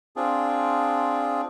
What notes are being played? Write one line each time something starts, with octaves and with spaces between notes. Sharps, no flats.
C4 D4 F4 G#4